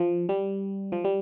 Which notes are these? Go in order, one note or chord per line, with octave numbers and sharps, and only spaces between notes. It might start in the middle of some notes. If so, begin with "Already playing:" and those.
Already playing: F3
G3
F3
G3